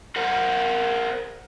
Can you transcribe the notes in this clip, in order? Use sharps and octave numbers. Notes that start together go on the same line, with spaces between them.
A#4 C5 F#5